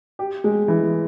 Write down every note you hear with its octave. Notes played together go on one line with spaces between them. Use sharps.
G4
G#3
E3